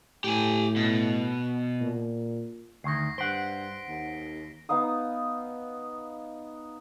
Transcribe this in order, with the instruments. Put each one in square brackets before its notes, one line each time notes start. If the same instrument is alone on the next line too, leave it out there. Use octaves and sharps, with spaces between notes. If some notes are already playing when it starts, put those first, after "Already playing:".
[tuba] A2 [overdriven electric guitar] G4 G#5
[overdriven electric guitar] B2
[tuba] A#2
[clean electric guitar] D2 D#3 [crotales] A#6 C7
[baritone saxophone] G2 [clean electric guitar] C5 F#5 [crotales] B6 D7 G7
[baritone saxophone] D#2
[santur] B3 D#4 F5 D#6